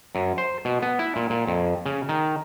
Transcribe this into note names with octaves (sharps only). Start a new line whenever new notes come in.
F#2
C5
B2
B3
E4
A#2
A#2
F2
C#3
D#3